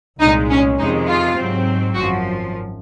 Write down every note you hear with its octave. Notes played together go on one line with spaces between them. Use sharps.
C2 A#2 G#3 D#4
C#4
F2 C3 D#3 G#3 D#4
F4
G#2 F#3 C4
G#1 F#2 F3 F#4